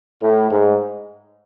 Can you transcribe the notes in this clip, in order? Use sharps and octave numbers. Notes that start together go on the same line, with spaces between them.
A2
G#2